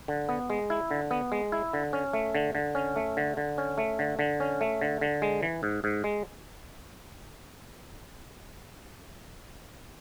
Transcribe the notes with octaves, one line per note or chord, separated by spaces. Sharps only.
D3
B3
G#3
E4
D3
B3
G#3
E4
D3
C#4
A3
D3
D3
C#4
A3
D3
D3
C#4
A3
D3
D3
C#4
A3
D3
D3
G#3
E3
G#2
G#2
G#3